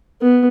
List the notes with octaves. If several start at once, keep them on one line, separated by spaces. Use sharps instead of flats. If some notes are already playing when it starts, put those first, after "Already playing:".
B3